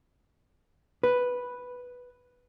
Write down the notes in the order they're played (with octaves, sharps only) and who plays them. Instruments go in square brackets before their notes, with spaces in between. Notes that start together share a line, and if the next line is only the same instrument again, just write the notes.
[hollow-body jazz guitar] B4